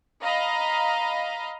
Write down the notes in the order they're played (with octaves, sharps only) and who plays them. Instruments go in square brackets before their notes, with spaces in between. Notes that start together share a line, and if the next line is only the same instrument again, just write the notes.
[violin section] D#5 F5 A#5 B5